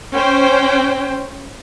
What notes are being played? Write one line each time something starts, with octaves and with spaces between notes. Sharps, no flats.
C#4 C5 G5